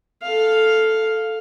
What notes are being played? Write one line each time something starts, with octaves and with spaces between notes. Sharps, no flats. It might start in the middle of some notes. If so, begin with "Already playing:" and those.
A4 F5